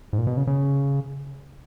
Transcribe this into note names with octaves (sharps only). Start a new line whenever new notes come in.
G#2
A#2
B2
C#3
C#3